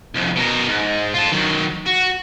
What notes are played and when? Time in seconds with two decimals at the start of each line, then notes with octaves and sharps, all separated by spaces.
0.15 C2 F2
0.36 B2 A#4
0.69 G#2
1.14 F4 A4
1.32 D#3 F#3
1.86 F#4